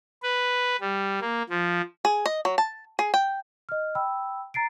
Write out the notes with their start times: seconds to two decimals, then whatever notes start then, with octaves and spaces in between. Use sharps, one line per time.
0.23 B4
0.81 G3
1.21 A#3
1.50 F3
2.05 G#4
2.26 D#5
2.45 F#3
2.58 A5
2.99 G#4
3.14 G5
3.69 D#5 F6
3.95 G5 B5 E6
4.54 A#5 A6 C7 D7